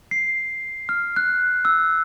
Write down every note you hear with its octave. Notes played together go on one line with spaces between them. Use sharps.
C7
F6
F#6
E6